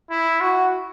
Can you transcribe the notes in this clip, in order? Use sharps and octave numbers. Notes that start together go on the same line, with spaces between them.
E4
F#4